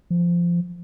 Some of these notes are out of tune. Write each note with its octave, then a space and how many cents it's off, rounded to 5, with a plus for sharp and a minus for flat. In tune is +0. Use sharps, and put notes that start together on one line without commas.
F3 -15